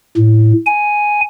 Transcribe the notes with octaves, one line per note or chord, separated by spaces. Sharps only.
A2
G#5